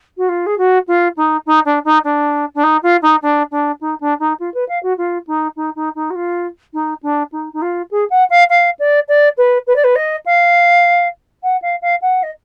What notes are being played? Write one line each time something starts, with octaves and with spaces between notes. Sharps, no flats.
F#4
F4
G#4
F#4
F4
D#4
D#4
D4
D#4
D4
D4
D#4
F4
D#4
D4
D4
D#4
D4
D#4
F4
B4
F5
F#4
F4
D#4
D#4
D#4
D#4
F#4
F4
D#4
D4
D#4
D#4
F4
G#4
F#5
F5
F5
D5
D5
B4
B4
D5
B4
D#5
F5
F#5
F5
F5
F#5
D#5